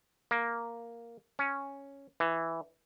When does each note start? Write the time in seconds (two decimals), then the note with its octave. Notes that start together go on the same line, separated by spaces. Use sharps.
0.31 A#3
1.39 C#4
2.20 E3